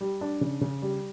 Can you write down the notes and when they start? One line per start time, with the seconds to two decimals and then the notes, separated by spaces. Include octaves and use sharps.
0.01 G3
0.21 D4
0.41 C#3
0.61 C#3
0.82 G3